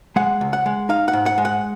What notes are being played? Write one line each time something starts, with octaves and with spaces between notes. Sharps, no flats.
G#3 F#5
C#2
F#5
G#3
D#4 F5
F#5
G#2
F#5
G#3
F#5